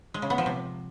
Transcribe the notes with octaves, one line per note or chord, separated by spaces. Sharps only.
G#3
C#3
B3
F3
C3